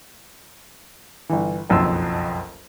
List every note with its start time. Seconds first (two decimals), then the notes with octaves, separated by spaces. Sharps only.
1.29 G1 E3
1.70 F#1 B1 F2 C6 E6